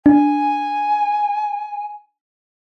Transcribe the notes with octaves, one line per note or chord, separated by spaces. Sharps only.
D4 G#5